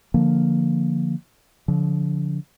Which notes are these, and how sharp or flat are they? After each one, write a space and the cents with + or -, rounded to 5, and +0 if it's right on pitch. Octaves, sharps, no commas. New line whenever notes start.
D3 +10 F3 +0 A#3 +0
D3 -35 F3 +0